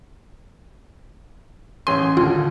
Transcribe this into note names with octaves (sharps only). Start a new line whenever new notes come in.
A1 C#4 C6 D#7
D#2 D3 F4